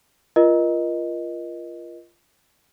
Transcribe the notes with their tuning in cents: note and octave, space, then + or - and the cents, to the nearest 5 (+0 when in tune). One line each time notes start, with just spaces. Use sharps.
F4 -20 A#4 +35 D#5 +0